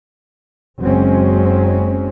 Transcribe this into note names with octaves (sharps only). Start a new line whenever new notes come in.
F#1 F#3 G#3 C4 C#4